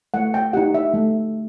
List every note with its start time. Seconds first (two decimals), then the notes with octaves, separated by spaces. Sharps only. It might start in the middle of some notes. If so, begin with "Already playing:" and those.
0.14 A3 F#5
0.34 G5
0.53 D#4 G4 F#5
0.74 E5
0.94 A3